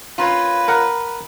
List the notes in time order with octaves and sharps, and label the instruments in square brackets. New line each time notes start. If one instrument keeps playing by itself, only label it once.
[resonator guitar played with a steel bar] A#3 C#4 F4 [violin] B4
[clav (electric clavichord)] A#4 F#5